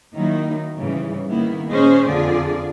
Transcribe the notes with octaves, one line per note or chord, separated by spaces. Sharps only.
D#3 F#3 A#3 D#4 E4
G#2 C#3 E3 G3
D#3 A#3 B3 E4
A#2 C#4 G#4 C5 D#5
F2 D3 F4 G#4 D5